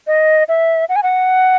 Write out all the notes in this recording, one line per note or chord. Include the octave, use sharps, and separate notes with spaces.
D#5
E5
F#5
G#5
F#5